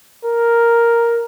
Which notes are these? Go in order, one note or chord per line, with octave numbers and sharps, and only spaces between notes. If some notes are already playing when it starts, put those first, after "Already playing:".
A#4